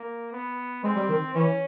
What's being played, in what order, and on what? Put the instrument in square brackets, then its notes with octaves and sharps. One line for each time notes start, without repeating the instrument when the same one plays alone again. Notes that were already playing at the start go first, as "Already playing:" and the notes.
Already playing: [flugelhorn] A#3
B3
[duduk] G#3 [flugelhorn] C4
[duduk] G3
D#3
[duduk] E3 [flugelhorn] C#4